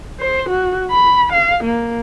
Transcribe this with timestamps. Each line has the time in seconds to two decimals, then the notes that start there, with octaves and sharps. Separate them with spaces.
0.20 C5
0.49 F#4
0.91 B5
1.32 F5
1.64 A#3